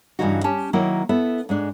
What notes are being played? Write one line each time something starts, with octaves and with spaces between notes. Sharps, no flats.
G2 A#2 C#3 E3 D#4 F#4
C#4 G4 A5
D#3 F#3 A#3 E4
B3 E4 A4 E5
G#2 G#3 D4